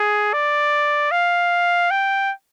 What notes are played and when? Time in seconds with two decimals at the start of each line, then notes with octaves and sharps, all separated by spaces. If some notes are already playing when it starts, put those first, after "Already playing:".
Already playing: G#4
0.33 D5
1.11 F5
1.91 G5